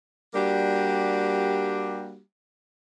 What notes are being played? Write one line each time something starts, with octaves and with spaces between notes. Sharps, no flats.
G3 A#3 D4 F#4 G4